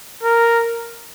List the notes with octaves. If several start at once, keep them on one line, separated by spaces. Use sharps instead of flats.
A#4